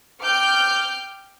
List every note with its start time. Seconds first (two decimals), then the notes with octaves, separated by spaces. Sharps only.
0.23 G5 D6 F6 G6